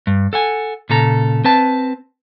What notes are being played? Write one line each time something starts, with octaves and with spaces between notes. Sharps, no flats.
G2
A4 F#5 G#5
A#2 C#3 A4 A#5
C4 B4 A5